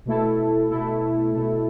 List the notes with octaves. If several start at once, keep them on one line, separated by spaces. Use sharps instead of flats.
B2 A3 E4 A4
B2 A3 E4 A4
B2 A3 E4 A4